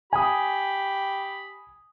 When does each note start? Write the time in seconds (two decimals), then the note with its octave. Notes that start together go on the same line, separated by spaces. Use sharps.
0.13 G4 G#5 B5 D#6